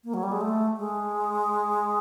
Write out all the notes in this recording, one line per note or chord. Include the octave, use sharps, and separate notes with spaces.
A#3
F#3
G3
G#3
A3
G#3